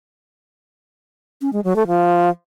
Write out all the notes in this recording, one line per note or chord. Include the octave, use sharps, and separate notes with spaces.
C#4
G#3
F#3
A3
F3